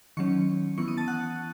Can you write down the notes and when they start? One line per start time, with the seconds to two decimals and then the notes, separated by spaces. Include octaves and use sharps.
0.17 D#3 F#3 C#4 C#6 C#7
0.78 E3 B3 E4 C#6 C#7
0.88 D#6 D#7
0.97 A5 A6
1.08 F#5 F#6